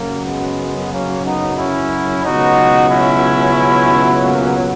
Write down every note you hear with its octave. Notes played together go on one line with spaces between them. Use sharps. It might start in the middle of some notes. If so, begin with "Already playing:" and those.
Already playing: F#2 C#3 F#3 A#3
G#3 B3
A#3 C#4
B3 D#4
C#4 E4
C#2 B2 F#3 D#4 F#4
C#4 E4
A#3 C#4